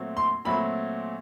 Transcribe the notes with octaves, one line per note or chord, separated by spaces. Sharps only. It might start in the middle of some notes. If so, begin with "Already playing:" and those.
Already playing: A#2 F#3 A3 C4
C6
A#2 F#3 A3 C4 B5